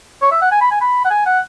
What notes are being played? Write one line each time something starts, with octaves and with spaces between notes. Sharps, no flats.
C#5
E5
F#5
G#5
B5
G#5
B5
F#5
G#5
F#5